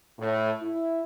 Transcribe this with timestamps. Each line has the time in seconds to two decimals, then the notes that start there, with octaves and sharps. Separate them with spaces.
0.19 A2
0.63 E4